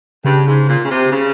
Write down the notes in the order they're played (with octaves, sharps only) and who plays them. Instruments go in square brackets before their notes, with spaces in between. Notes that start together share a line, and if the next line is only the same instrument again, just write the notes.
[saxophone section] G2 [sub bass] C#3
[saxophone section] G#2
A#2
C#3
C3
C#3